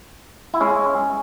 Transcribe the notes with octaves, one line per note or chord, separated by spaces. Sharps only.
E4
G#3 C#4